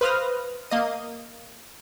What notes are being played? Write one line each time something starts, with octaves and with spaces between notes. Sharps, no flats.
B4 C5 F5 D#6 F6 A#6
A#3 D#5 D#7